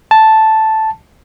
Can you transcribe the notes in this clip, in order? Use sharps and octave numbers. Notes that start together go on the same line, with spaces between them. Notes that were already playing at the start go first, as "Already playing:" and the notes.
A5